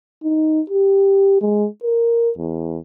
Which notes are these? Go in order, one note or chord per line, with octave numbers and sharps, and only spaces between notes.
D#4
G4
G#3
A#4
E2